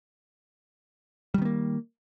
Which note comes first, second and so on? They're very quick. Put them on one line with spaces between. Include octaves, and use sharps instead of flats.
G3 D#3 B3 A#3